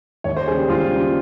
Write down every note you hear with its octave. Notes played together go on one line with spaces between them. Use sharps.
D#2 C#5
C5
C#3 G3 G#4
G4
D#2 F4
C#3 G3